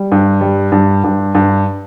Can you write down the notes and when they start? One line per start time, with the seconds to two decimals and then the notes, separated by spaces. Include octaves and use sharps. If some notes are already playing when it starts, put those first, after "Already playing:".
Already playing: G3
0.12 G2
0.41 G3
0.72 G2
1.04 G2
1.35 G2